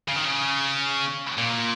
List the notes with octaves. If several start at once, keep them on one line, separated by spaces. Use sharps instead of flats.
C#3
D#3
C#3
A#2